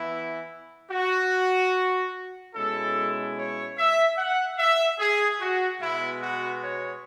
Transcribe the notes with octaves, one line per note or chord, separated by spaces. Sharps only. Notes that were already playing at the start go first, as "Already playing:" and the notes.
Already playing: E3 B3 E4
F#4
B2 G#3 C#4 E4 A4
C#5
E5
F#5
E5
G#4
F#4
B2 G#3 B3 E4
F#4
C#5